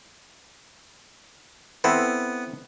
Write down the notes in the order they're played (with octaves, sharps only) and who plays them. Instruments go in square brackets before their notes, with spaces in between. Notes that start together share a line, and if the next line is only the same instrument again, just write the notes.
[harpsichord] B3 [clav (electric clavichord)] C4 E4 A4